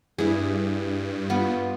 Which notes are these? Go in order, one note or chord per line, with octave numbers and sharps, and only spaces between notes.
G2 E4 G#4
B3 F4